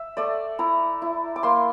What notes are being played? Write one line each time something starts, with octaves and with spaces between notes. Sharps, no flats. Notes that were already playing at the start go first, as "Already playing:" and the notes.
Already playing: E5
A3 D5
E4 A#5
E4
D6
A#3 C6